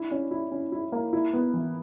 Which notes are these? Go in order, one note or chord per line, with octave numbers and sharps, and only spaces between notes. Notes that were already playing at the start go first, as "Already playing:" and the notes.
Already playing: D4 E4
C#4
E4
C#4
E4
A#3
E4
B3
E3